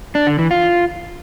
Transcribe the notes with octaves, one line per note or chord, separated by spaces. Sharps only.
D4
D3
E3
F4